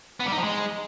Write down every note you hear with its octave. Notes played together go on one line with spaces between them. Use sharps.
B3
G3
D#4
F3
G#3